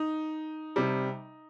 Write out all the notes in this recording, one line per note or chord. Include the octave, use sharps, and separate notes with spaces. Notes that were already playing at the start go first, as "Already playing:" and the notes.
Already playing: D#4
C3 G3